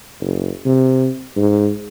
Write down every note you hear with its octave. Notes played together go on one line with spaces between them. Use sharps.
F#1
C3
G#2